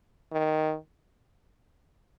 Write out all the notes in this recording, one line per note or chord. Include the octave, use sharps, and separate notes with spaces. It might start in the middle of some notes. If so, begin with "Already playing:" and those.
D#3